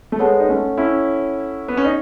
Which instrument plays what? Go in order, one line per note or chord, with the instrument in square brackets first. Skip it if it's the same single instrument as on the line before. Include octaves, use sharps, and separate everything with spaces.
[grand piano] A3
[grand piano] G#3 B3 [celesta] A4 C#5 F#5 A5
[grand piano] D#4
A3 C#4
C#4 E4
B3
C#4
D#4